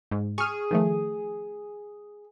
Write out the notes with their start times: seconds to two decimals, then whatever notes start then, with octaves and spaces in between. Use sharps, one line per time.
0.11 G#2
0.38 G#4 C#6 F6
0.71 D#3 F3 A3